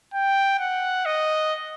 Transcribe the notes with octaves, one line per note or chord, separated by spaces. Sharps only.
G5
F#5
D#5